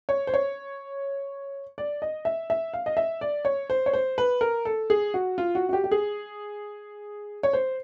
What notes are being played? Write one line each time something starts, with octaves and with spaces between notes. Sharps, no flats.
C#5
C5
C#5
D5
D#5
E5
E5
F5
D#5
E5
D5
C#5
C5
C#5
C5
B4
A#4
A4
G#4
F#4
F4
F#4
F#4
G4
G4
G#4
C#5
C5